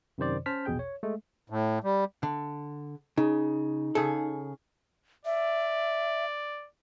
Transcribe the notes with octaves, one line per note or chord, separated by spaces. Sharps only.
F#2 C3 D#3 C5 D5
C#4 C5 A5 F6 B6
A#1 E2 B2 G#4 G5 G6
C#5
G#3 A3
A2
G3
D3
C#3 D#4
C#3 G#4 A4
D5 E5